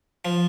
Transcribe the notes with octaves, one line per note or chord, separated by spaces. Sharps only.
F3